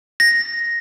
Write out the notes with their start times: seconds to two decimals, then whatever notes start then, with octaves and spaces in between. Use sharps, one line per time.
0.20 A#6